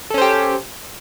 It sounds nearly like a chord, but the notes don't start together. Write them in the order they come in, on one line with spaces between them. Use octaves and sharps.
A4 C#4 C5 G4